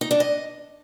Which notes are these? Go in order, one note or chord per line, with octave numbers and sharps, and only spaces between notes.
D#4
D4
D#5